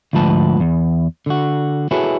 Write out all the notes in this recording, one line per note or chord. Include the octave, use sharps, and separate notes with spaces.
D2 G#2 F3 B4 A5
E2
D3 F#4
E4 F#4 G#4 A4 B4 C#5